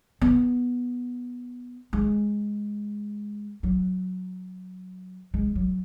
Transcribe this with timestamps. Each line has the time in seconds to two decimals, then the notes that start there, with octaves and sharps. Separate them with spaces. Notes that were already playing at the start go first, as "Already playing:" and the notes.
0.21 B3
1.93 G#3
3.63 F#3
5.34 G#3
5.55 F#3